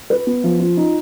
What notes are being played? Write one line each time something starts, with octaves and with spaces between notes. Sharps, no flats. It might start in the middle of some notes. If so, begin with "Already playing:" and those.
B4
B3
F3
F4
D#4